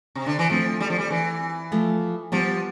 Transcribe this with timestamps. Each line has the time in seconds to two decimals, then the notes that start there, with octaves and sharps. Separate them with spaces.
0.15 C3
0.26 D3
0.39 E3
0.50 F3 A3 C4
0.80 G3
0.90 F3
0.98 G3
1.11 E3
1.72 F3 A3
2.32 F3 G3 B3